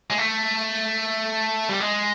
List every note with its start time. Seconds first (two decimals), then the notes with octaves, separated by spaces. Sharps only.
0.10 G#3
0.18 A3
1.69 G3
1.80 G#3